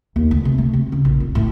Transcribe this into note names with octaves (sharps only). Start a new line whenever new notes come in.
D#2
D2
C3
A3
C3
C#3
A#1
F1
A2